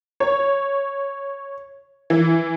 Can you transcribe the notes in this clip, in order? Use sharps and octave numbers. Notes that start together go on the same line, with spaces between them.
C#5
E3